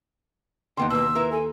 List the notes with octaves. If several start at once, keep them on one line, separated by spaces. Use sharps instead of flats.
D#2 D3 B3 D#4 G5 C6
B2 A#3 B4 E6
E4 A#4 B4
A4 G#5